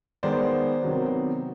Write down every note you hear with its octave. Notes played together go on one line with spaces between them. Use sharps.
D#3 G#3 B3 C5 D5
C3 D#3 F#3 B3